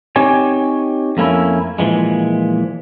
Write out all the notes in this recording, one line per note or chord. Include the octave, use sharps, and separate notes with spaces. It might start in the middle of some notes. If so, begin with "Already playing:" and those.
C4 D#4 G4 C#5 G#5
F2 A3 A#3 C#4 E4
A#2 E3 F3 G#3